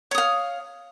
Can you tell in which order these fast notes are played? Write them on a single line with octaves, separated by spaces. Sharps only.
C#5 D#6 F5